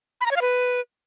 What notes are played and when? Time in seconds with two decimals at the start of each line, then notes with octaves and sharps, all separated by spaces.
0.21 B5
0.26 A#5
0.31 C#5
0.36 F5
0.42 B4